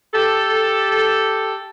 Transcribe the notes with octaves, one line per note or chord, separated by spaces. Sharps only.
G4 A4